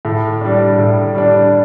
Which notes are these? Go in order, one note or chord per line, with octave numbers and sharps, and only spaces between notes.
A2
G3 D4
A2
G3 D4